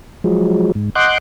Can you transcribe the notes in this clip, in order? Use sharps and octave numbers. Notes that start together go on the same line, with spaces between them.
F3 F#3 G#3
G#2
D#5 F#5 C6 D6 F#6 G6